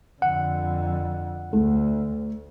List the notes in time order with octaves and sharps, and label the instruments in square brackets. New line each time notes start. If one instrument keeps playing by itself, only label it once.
[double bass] F2 D3 [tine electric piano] F#5
[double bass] D2 [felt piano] A3